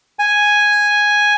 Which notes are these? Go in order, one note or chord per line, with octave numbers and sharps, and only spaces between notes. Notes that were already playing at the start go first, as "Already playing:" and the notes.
G#5